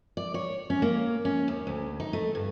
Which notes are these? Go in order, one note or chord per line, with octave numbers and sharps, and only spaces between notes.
D5
C#5
C#4
A#3
C#4
D#2
D2
D#4
A3
G2